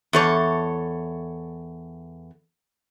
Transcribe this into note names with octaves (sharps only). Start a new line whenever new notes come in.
E2 A4 C#5